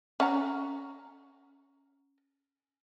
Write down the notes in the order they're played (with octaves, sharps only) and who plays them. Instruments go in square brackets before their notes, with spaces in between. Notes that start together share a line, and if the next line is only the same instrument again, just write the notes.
[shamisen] C#4 F#5 A#5